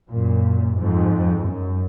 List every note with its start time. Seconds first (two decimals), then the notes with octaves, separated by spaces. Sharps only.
0.10 F#2 A#2
0.78 F2 G#2
1.46 F#2